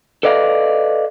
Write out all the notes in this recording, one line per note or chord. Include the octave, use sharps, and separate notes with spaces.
A4 B4 D5 D#5 F5